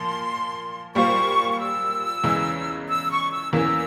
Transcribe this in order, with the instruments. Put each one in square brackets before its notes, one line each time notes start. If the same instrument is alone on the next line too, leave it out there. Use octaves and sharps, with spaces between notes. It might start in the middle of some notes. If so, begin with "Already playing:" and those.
Already playing: [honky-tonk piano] A#2 F3 [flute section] C6
[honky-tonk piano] A#2 G3 A#3 F4 C5 [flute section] C#6
[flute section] C#6
E6
[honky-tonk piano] E2 C#3 E3 G#3
[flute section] E6
C#6
E6
[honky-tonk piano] E2 E3 A#3 C#4 [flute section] E6